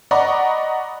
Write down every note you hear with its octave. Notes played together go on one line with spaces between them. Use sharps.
D5 D#5 F#5 A#5 B5 C#6